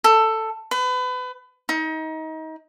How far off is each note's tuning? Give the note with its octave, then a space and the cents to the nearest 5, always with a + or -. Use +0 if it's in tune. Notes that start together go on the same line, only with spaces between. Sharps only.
A4 +10
B4 +30
D#4 +30